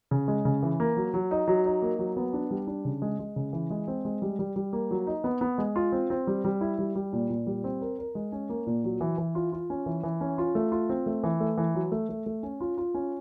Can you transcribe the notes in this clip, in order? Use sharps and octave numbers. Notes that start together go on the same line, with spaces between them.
C#3
G#3
C#3
E3
A#3
F#3
F#3
D#4
F#3
D#4
A#3
F#3
B3
D4
G3
D4
C#3
G#3
G#3
C#3
E3
G#3
C4
G#3
G3
G3
G3
A#3
F#3
D#4
B3
B3
G#3
F4
C4
C4
G3
G3
E4
G3
G3
A#2
A#2
G3
C4
A#4
A#4
G#3
C#4
A#3
A#2
F#3
E3
E3
F4
F4
C#4
E3
E3
C#4
F4
A3
F4
C4
A3
E3
A3
E3
F#3
A3
A3
A3
C#4
F4
F4
C#4